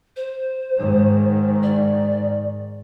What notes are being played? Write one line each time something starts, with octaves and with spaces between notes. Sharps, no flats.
C5
G#2 D#3
D5